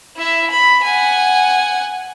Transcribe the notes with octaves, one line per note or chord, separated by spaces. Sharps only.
E4 E5
B5
F#5 G#5